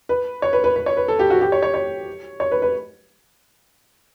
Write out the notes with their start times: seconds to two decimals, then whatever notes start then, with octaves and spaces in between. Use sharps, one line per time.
0.09 B4
0.42 C#5
0.53 B4
0.64 B4
0.76 B4
0.86 C#5
0.97 B4
1.08 A4
1.19 G4
1.30 F#4
1.41 G4
1.52 C#5
1.63 C#5
1.74 C#5
2.40 C#5
2.51 B4
2.62 B4